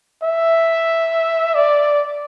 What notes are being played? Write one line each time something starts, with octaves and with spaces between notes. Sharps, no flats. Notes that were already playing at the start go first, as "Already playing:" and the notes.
E5
D5